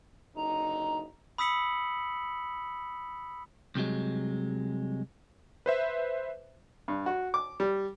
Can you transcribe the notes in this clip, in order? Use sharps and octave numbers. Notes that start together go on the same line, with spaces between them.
F#1 D3 D#4 A#5
B5 D#6 E6 B6 C#7 F#7
C2 C3 F#3 G#3
B4 C5 E5
G2
F#4
D6
G3